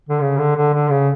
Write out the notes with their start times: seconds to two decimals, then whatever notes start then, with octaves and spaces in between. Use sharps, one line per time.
0.09 D3
0.21 C#3
0.38 D3
0.56 D3
0.74 D3
0.91 C#3